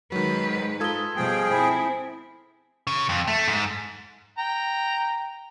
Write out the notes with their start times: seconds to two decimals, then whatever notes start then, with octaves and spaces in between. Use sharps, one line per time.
0.12 D#3 F#3 G#3 B4
0.42 G#2
0.80 F4 A4 D#6 G#6 G7
1.16 B2 F3 G3 G#4 G5
1.51 C4 E4 C5 G#5 B5
2.87 C#3
3.09 F2
3.27 A3
3.48 G#2
4.38 G5 A#5